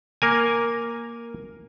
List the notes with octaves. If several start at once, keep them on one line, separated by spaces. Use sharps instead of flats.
A#3 A#4 G#5